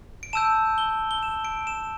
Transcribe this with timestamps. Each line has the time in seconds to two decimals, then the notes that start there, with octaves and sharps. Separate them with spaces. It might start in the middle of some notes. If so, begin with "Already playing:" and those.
0.23 D7
0.33 A5 E6 G6 E7
0.78 G7
1.11 G7
1.23 E7
1.45 D7
1.67 E7